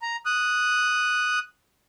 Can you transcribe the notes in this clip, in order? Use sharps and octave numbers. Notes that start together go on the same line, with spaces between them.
A#5
D#6 F#6